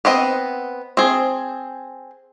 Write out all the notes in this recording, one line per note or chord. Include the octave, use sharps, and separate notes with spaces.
B3 C4 D#5 F#5
C4 G#4